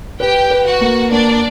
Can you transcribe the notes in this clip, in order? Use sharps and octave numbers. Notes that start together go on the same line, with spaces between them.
G4 B4 G5
B4
F#4 F#5
A#3
A#3 D4 D5